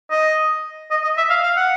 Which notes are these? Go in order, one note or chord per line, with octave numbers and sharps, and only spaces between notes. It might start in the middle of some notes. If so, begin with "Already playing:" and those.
D#5
D#5
D#5
E5
F5
F5
F#5